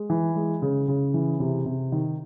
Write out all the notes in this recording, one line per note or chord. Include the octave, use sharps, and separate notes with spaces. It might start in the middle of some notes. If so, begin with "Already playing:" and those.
Already playing: G#3
E3
G#3
C#3
C#3
E3
C3
C3
D#3